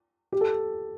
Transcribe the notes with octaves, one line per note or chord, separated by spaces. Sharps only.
G4
A4